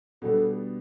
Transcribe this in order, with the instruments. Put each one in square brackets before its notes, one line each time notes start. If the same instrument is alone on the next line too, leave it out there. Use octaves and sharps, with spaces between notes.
[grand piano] B2 G3 B3 D4 [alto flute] A4